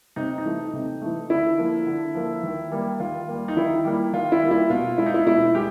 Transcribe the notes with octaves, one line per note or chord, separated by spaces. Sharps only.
C3 D#4
D#4
E3 A3
C3
E3 A3
D3 E4
F3 A#3
D3
F3 A#3
D#3
G3 A#3
D#3 F4
G3 A#3
D#4
D#3 E4
G3 A#3
D#3 F4
E4
G3 A#3
E4
B2 F4
G#3 E4
D#4
E4
B2 E4
G#3 G4